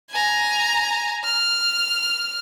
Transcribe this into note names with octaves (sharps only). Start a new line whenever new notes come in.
G#5 A#5
F6